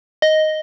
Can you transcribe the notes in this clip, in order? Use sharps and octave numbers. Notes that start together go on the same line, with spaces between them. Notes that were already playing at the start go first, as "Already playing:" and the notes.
D#5